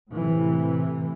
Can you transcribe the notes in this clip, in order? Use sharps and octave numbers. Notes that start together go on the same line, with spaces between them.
A2 C3 E3